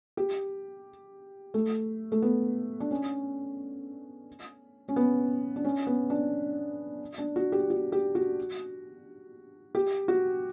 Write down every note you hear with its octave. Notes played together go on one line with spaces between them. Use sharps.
G4
A3
A3
B3
D4
C#4
C#4
B3
D4
C#4
B3
D4
D4
F#4
G4
F#4
G4
F#4
G4
F#4